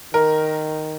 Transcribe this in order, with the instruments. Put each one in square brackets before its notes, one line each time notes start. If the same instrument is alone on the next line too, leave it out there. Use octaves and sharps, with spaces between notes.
[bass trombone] D#3 [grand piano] A#4